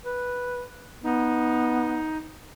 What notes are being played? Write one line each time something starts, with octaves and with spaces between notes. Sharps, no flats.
B4
B3 D#4